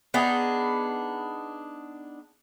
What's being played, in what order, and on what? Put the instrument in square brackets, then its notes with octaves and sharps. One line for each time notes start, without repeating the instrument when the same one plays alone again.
[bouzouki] B3 D4 D#4 G#4